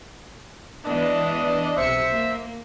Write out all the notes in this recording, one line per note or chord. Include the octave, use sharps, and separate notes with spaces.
E3 G#3 B3 D4 D#5
B1 C3 C5 E5 C#7
A#3